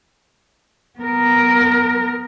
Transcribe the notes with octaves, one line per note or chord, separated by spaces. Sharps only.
B3 A#4